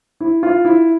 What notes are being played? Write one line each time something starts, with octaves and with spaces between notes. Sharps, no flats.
E4
F4
E4